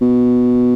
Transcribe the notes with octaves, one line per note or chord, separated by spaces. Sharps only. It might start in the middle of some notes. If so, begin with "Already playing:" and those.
B2